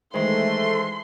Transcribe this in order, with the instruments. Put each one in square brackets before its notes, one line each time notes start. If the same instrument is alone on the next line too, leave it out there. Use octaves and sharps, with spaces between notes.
[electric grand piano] D#3 E3 G#3 [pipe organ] A3 [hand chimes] C5 E5 [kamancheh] C6